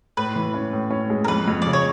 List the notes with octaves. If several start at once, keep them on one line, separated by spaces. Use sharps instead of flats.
A2 B4
E3
C#4
A2
C#4
G#3
A#4
F2 B4
F2
C#3 D5
C#5